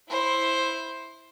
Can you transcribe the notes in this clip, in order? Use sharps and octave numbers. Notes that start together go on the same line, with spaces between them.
E4 C5